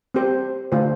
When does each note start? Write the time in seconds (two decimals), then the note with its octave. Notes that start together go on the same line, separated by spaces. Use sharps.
0.14 C4 G4 C5
0.72 D3 A3 F4 C5